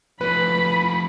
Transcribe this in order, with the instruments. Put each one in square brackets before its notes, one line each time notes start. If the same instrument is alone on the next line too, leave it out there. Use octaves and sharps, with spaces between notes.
[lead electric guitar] F3 A3 [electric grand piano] B4 [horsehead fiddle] B5